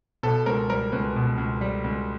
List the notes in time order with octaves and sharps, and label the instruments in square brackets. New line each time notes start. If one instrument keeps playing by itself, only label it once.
[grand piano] B2 A4
C#2 A#4
G3 A#4
C#2 B4
B2
C#2
G3
C#2